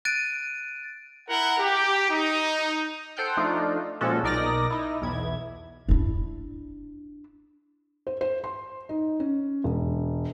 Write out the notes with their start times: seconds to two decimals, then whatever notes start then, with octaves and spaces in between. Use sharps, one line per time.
0.05 F#6 A6 D7 D#7
1.27 E4 A#4 F#5
1.59 G4
2.09 D#4
3.17 A4 C5 F#5 G5 F6 G6
3.37 F3 A3 D4 D#4 F4
4.01 A#2 F3 G#3 C#4 F#4 A4
4.23 B1 D#4 A#4 D5 D#5 A#6
4.70 D#4 E4
5.01 B1 E2 E4 G#6
5.88 D4 E4
8.07 C5
8.21 C5
8.44 C6
8.89 D#4
9.20 C#4
9.64 E1